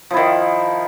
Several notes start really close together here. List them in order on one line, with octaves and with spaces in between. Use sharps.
F3 E4 D#3